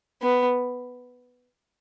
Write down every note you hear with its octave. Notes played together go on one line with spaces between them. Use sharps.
B3